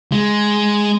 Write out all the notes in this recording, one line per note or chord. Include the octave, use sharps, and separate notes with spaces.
G#3